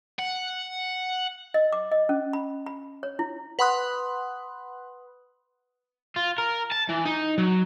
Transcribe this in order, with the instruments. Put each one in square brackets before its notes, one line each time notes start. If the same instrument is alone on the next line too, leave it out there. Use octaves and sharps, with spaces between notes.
[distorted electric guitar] F#5
[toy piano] D#5
D6
D#5
C#4
B5
B5
C#5
E4
[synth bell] B4 F#5 B5 C6 D#6 F#6
[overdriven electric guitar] F4
A#4
A5
E3
D#4
F#3